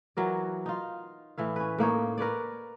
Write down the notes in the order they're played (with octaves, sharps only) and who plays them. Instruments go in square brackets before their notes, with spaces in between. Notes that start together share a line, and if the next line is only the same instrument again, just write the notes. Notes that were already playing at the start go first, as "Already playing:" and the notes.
[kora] E3 F#3 A#4 D5
D#4 F4
A2 E3 E4 F5
C#4 B4
A2 A#3 D#4 C#5
A#4 B4 C#5 D5